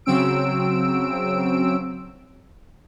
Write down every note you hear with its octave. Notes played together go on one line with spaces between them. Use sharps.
C#3 F#3 C4 E6 D7